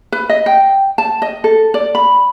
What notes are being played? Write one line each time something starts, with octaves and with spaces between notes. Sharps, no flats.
B4
D#5
G5
A5
D#5
A4
D5
B5